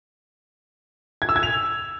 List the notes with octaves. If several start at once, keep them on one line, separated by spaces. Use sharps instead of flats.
G#6
E6
G#6
F7